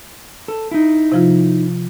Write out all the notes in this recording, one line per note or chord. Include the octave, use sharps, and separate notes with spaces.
A4
D#4 E4
C3 F3 F4